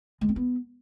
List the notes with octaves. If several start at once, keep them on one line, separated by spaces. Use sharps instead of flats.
G#3
C4
B3